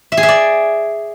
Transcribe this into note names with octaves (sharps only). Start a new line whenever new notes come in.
E5
G#4
E5
D5